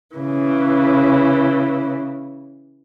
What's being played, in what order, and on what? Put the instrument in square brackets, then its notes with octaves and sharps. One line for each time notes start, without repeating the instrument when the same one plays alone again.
[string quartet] C#3 E3